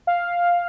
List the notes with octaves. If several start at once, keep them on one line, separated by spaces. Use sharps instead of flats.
F5